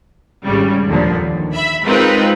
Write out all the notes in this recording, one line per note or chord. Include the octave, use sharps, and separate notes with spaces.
G#1 C#3 G3
D#2 A#2 D3 F3
D#2
E5 B5
G#3 C4 D#4 F4 A#4 B4